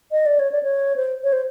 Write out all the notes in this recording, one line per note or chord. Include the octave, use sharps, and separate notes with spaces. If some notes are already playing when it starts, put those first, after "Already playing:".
D#5
D5
C#5
D5
C#5
C5
C#5
C5